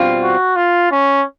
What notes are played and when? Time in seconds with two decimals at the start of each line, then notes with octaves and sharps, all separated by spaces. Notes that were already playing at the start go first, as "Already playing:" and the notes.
Already playing: B2 G3 C4 F4
0.22 F#4
0.56 F4
0.92 C#4